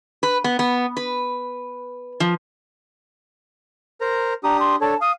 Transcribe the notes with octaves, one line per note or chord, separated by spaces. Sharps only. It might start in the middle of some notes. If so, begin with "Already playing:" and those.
B4
B3
B3
B4
F3
A#4 C5 A#5
D4 G4 A#5 D#6
C6
D4 A4 C#5 A5
F5 D#6